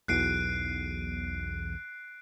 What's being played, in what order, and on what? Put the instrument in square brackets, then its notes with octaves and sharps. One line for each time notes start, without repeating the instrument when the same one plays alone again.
[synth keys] B1 E2 D#7 [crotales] F#6 C7 D7